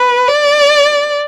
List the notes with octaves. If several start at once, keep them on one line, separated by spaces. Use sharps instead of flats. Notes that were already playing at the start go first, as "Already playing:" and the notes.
Already playing: B4
D5